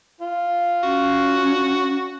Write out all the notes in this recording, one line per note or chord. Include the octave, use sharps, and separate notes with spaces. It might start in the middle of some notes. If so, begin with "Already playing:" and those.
F4
C#4 F#4